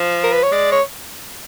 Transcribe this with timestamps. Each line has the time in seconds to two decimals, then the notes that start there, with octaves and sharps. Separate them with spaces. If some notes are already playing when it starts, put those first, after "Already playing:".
Already playing: F3
0.24 A#4
0.32 B4
0.43 C#5
0.52 G#3 D5
0.72 C#5